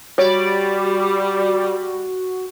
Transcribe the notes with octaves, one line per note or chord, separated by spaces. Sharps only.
G3 F#4 C#5 D5